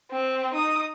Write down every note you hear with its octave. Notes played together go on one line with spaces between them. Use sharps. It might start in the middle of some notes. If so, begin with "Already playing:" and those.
C4
D#4 D#6